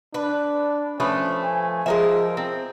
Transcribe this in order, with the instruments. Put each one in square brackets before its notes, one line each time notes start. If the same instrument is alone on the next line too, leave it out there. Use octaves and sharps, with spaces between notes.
[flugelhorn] D4 [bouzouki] B4
[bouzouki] F3 A3 B4 [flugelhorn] C#4
[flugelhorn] G#5
[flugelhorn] F3 [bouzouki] G#3 A#4 E5
[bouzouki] C4